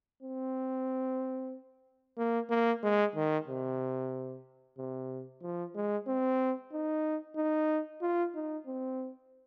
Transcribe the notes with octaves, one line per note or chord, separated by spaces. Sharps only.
C4
A#3
A#3
G#3
D#3
C3
C3
F3
G#3
C4
D#4
D#4
F4
D#4
C4